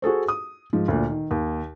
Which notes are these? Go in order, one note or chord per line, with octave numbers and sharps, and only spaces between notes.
F#4 G#4 A4 C5
D#6
G#2 F3
D2 A#2
D#3
D#2